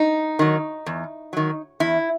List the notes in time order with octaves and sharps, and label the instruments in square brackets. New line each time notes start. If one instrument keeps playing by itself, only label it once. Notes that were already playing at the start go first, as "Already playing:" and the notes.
Already playing: [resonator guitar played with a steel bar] D#4
D#3 F#3
E2
D#3 F#3
E2 E4